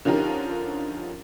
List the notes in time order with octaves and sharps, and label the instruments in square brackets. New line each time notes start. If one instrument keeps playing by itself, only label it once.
[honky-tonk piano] D3 F3 C#4 D#4 G4 A#4